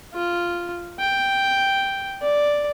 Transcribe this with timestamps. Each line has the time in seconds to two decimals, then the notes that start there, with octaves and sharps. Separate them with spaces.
0.14 F4
0.99 G5
2.22 D5